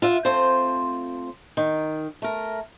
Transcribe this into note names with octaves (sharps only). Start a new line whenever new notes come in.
F4 E5 F#5
A3 C4 F4 C5
D#3
A3 A#4